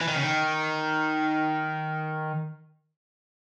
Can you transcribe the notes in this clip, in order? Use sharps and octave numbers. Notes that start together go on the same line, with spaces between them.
E3
D#3
C#3
D#3